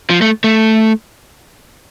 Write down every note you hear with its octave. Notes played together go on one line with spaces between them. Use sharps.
F3
A3
A3